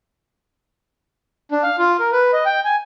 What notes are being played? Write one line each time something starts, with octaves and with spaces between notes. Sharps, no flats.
D4
F5
F4
A#4
B4
D#5
G5
G#5